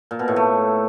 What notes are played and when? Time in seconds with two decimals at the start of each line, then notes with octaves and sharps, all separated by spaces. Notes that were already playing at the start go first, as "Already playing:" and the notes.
0.11 A#2
0.19 B2
0.28 A2
0.36 A3